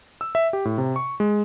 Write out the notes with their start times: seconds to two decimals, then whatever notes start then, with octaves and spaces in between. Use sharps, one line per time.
0.21 E6
0.35 E5
0.53 G4
0.65 A2
0.78 C3
0.96 C#6
1.20 G#3